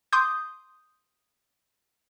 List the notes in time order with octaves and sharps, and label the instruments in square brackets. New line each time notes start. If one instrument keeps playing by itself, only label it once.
[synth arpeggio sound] C6 D6 D#6 G6